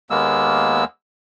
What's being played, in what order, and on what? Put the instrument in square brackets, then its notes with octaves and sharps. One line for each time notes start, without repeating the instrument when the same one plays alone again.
[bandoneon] D#2 G#3 A#3 B3 E6